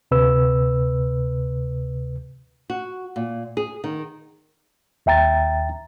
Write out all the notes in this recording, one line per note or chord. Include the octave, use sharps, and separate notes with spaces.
D2 C3 B4 E6
F#4
A#2
G#4
D#3
D#2 E5 G5 A#5 A6